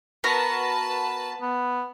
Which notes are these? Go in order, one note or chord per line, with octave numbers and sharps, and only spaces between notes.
B3 F#4 A#4 B4 A5
B3